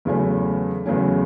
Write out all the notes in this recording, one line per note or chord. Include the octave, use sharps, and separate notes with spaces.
E2 C#3 F#3 A3 C#4
E2 C#3 F#3 A3 C#4